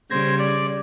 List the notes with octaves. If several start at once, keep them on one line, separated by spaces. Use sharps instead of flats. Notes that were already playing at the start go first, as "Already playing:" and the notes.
C#3 G3 C5 G#6 A#6
D5